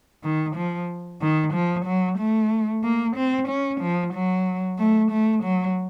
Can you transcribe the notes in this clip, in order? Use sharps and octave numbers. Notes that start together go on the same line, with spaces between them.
D#3
F3
D#3
F3
F#3
A3
A#3
C4
C#4
F3
F#3
A3
A3
F#3